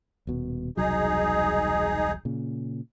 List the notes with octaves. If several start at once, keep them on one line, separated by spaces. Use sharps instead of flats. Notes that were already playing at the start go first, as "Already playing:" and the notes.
D#1 B2
E1 C2 F#3 D#4 G#4
A#2 C#3